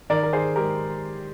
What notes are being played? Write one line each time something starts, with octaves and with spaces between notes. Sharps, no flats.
D#3 A#4 D5
A#4
D#3 G#4 C5
G#3 G4 A#4